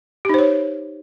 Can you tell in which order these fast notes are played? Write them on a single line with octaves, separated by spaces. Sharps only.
G4 D#4 C5 C#5